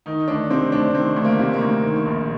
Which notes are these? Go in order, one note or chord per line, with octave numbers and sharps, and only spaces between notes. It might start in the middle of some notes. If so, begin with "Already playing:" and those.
D#3 D#4
D2 D4
C3 C4
D2 D4
D#3 C4
D2
A#3
C3
A#3
D2
D#3
A#1